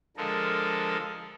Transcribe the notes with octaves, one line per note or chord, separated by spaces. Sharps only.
D3 F3 G#3 A4 A#4